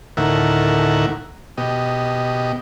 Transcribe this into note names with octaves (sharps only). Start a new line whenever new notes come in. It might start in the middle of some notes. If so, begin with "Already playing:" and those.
D2 A2 D#3 A#4 E5 F#5
B2 G4 D#5